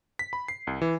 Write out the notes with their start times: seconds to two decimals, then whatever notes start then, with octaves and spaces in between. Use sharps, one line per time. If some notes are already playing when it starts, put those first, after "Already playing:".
0.19 B6
0.33 B5
0.48 C7
0.67 C2
0.82 E3